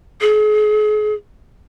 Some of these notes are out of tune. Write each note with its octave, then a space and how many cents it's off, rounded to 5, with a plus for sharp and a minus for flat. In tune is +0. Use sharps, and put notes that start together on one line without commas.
G#4 +40